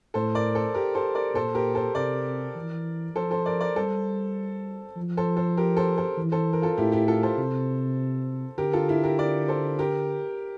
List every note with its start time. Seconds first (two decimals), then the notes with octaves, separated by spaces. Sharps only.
0.14 A2 A4 C5
0.35 A#4 D5
0.55 A4 C5
0.74 G4 A#4
0.95 A4 C5
1.15 A#4 D5
1.34 A#2 A4 C5
1.55 G4 A#4
1.75 A4 C5
1.95 C3 A#4 D5
2.55 E3
3.15 F3 A4 C5
3.31 A4 C5
3.46 A#4 D5
3.61 A#4 D5
3.76 G3 A4 C5
4.96 F3
5.17 A4 C5
5.37 A4 C5
5.57 G4 A#4
5.77 A4 C5
5.98 A4 C5
6.17 E3
6.32 A4 C5
6.53 A#4
6.62 F4 A4
6.77 A2 E4 G4
6.92 E4 G4
7.08 F4 A4
7.23 A4 C5
7.38 C3
8.58 D3 G4 A#4
8.73 F4 A4
8.88 E4 G4
9.04 G4 A#4
9.19 A#4 D5
9.48 A4 C5
9.79 G4 A#4